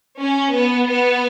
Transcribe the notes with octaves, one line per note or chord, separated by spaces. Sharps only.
C#4
B3
B3